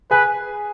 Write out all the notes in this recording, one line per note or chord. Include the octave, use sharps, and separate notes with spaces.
G#4 B4 G#5